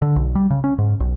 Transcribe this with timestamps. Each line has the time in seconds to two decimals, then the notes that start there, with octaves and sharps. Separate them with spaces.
0.02 D3
0.16 B1
0.35 G3
0.50 C#3
0.64 C#4
0.78 G#2
1.00 B1